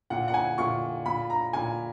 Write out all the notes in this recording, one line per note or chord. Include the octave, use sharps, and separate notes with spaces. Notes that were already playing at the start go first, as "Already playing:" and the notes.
A#2 F#5
F#5
G#5
A#2 C#6
A#2 B5
A#5
A#2 G#5